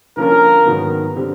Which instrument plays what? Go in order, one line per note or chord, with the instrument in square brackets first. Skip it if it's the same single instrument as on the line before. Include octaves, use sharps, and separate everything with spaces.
[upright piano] D3 F3 A#3 C#4 F4 [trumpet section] A#4
[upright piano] G#2 D#3 F#3 B3
D3 G3 C4